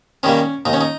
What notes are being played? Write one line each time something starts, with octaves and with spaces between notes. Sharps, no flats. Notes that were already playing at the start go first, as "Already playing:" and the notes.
D#3 G3 A#3 C#4
D#2 D#4
C#4
D#4